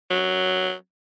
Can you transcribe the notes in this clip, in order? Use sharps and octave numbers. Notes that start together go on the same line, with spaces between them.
F#3